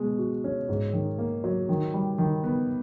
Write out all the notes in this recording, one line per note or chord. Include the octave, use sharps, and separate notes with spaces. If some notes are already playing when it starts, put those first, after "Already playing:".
Already playing: B2 G#3
F#4
C#4
G#2
D#3
A#3
F#3
D#3
G3
D#3
B3